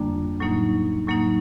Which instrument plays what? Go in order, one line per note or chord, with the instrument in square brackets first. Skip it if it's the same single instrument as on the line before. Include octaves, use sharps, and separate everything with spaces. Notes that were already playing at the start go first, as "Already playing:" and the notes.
Already playing: [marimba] F2 D3 G3 A#3 D4
A2 F#3 A#3 D#4
A2 F#3 A#3 D#4